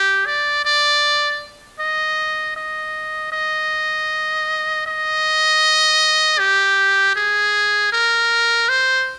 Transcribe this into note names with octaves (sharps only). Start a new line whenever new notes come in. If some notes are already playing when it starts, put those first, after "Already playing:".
Already playing: G4
D5
D5
D#5
D#5
D#5
D#5
G4
G#4
A#4
C5